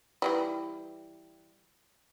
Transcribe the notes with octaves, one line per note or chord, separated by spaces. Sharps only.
E3 F#3 G3